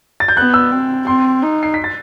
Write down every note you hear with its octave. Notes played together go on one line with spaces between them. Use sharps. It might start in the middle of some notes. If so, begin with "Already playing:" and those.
A6
G6
B3 F#6
E6
C4
C4 C6
D#4
C7
B6
A6